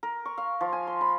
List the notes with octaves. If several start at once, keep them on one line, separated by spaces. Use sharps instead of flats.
A#4
C#6
F5
F3
G#5
C6
B5